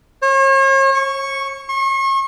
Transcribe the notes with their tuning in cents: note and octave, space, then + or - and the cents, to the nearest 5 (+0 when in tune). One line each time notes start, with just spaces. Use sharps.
C#5 -40
C#6 -5
C#6 -40